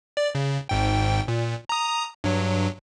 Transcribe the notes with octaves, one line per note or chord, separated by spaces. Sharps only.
D5
C#3
G#1 G#2 G5
A#2
A#5 D#6
G2 F#3